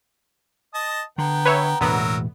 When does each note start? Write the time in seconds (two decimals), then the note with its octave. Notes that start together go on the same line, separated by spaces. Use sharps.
0.74 D#5 A5 D#6
1.18 D3 B3 G5 A#5
1.45 B4 C#5 E5
1.81 E1 A2 D3 F#3 B3 A#4 E6